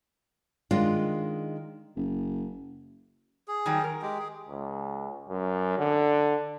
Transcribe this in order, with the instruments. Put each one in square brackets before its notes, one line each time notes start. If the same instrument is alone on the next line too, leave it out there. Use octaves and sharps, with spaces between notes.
[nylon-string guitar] D#3 G#3 D4 F4
[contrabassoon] F#1
[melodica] G#4
[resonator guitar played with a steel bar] D#3 F#3 G3
A#4
[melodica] G#3 G4
G#4
[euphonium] C#2
F#2
D3